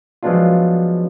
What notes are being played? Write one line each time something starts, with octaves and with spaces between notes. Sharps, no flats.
F3 F#3 G#3 B3 D4 F4